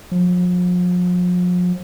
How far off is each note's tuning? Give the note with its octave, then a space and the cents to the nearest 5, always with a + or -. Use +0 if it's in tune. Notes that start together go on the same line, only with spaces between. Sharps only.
F3 +40